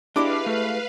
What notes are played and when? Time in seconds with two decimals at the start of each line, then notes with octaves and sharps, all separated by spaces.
0.16 G#3 D4 E4 G4 B4 F5 D6
0.46 A3